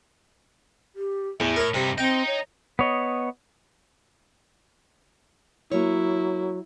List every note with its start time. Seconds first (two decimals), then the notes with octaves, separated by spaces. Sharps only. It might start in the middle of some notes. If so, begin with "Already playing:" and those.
0.96 G4
1.40 E2 A2 E5
1.56 A#4 C#5
1.74 G2 C3 D#4 G4
1.98 C4 D#5 G5 A#5
2.27 C#5
2.79 B3 C#5 D#5
5.71 F#3 A#3 E4 C#5